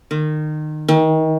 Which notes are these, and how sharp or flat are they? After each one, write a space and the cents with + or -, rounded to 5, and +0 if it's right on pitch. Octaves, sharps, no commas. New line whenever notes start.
D#3 -25
D#3 +30